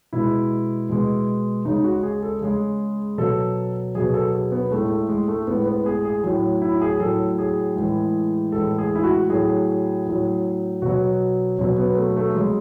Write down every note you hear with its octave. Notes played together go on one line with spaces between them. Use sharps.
B2 G#3 E4
B2 G#3
C#3 G#3 D#4
F#4
G#4
A4
C#3 G#3 G#4
B2 F#3 A4
B2 F#3 G#4
A4
G#4
B3
A2 G#3 A3
A3
G#3
A3
A2 G#3 B3
B3
G#4
G#4
A2 F#3
E4
G#4
A2 F#3 A4
G#4
A2 E3 G#3
A2 E3 G#3 A4
G#4
E4
F#4
A2 F#3 G#4
A2 F#3
B2 F#3 F#4
B2 F#3 C#4
B3
A3
A3
C#3 F#3 G#3